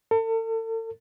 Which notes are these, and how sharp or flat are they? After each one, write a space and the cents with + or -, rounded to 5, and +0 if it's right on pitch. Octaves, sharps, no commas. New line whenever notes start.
A4 +40